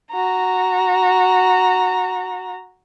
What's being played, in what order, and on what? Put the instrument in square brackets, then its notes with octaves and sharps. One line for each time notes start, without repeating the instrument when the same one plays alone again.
[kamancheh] F#4 A#5